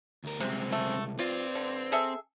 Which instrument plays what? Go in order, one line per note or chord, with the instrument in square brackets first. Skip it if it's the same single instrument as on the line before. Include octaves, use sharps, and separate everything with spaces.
[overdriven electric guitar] D2 A#4
[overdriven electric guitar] C2 G#3 [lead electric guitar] F#2 C4 [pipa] C3
[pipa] A3
[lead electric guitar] C4 [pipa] F4 [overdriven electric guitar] B4 D5
[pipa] D3
G#4 A4 E5